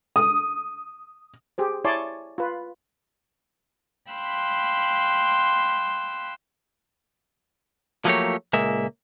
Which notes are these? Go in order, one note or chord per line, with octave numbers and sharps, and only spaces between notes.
D#6
G4 G#4 C5
E4 C#5 D5 G#5 A5 C6
F4 B4
F5 G5 B5 C6 E6 F#6
F3 F#3 A3 A#3 G4 C#5
C#2 A#2 G#3 A#3 E5